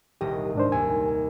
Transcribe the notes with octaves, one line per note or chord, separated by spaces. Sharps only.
D#1 C2 G4 D#5
G#2 D4 C5
D#2 G#5